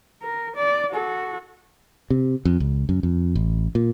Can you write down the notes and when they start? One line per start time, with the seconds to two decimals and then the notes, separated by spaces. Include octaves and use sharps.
0.22 A#4
0.55 D5
0.91 F#4 A4
2.10 C3
2.45 F2
2.60 C#2
2.89 F#2
3.03 F2
3.36 A1
3.75 A#2